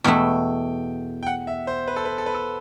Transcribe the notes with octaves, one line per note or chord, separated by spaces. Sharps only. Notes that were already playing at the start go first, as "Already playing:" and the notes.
E2 B2 A3 E4 G5
G5
F#5
E5
C5
B4
A4
B4
A4
B4
A4